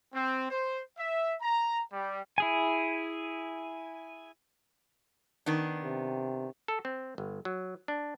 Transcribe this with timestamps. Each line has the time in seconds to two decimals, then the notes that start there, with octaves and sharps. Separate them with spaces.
0.14 C4
0.51 C5
0.98 E5
1.41 A#5
1.93 G3
2.38 E4 G#4 G#5
5.46 D#3 B3 D4
5.83 C3
6.68 A4
6.85 C4
7.18 G1
7.45 F#3
7.88 D4